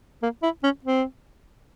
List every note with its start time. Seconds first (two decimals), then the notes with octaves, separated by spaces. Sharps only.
0.22 A#3
0.43 E4
0.63 C#4
0.84 C4